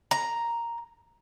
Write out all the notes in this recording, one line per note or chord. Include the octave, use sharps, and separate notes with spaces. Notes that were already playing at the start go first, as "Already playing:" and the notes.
A#5